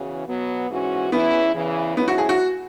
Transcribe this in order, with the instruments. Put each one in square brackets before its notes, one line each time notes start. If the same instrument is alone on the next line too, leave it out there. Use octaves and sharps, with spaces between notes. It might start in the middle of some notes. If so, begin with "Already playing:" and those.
Already playing: [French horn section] E2 C#3 E3 C#4 F#4
B2 F#3 B3
G#2 E3 C#4 F#4
[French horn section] E2 E3 C#4 E4 [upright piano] B3
[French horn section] E2 C#3 E3
[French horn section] G#2 F#3 C#4 E4 [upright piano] B3
[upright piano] F#4
G#4
F#4